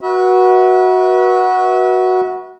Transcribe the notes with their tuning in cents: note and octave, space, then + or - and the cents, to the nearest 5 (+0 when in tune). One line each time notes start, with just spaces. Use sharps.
F#4 +0 B4 -35 E5 -35